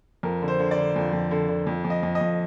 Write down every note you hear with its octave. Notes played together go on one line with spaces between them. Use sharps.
F2 A#4
D3
C5
D3
D5
D3
F2
F2
D3
D3
F2
F2
D#5
F2
D#5
F2